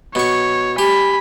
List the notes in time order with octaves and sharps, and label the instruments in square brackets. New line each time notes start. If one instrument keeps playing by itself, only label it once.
[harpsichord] B2 C#6 [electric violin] C#5
[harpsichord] G4 [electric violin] G#5 B5